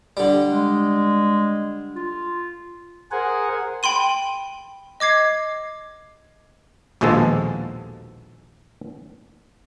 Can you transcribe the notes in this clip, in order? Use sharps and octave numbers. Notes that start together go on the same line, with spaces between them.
D3 G3
G#3
F4
G#4 A#4 C5 F#5 G#5
G5 B5 C6 D#7
D#5 D6 G#6 C7
A#1 D#2 B2 F3 G#3 A4